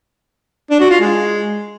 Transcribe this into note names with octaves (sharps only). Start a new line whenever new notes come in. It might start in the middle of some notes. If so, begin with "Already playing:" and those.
D4
F#4
F4
G#3